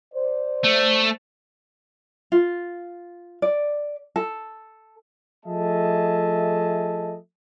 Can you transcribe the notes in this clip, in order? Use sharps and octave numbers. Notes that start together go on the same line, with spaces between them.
C5 D5
A3
F4
D5
A4
F3 A3 G#4 D#5 E5 A5